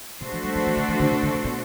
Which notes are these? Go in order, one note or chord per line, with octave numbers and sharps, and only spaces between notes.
C3 A3 D4 F#4 A4 C5
E3
G3
F#3
E3
D3
E3
D3
C3
D3
C3
B2